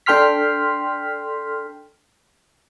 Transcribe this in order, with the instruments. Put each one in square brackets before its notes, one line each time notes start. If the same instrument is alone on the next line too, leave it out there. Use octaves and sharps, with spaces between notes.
[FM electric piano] D4 A4 G5 C6 F6 B6